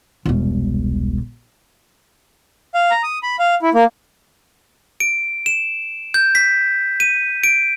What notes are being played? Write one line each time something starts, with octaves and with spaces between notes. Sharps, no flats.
E1 C2
F5
A#5
D#6
B5
F5
E4
A#3
D7
E7
G6
B6
D#7
D7